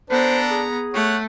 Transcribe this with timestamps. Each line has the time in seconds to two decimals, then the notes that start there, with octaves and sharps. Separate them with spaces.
0.10 B3 D4 A4 C5 A#5
0.51 G#4
0.94 A3 C#5 F#5